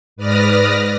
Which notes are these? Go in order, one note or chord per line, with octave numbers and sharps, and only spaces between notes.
G#2 B4 D5 D#6 F6 A#6